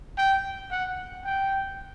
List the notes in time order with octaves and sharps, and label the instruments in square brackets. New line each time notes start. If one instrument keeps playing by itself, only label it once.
[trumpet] G5
F#5
G5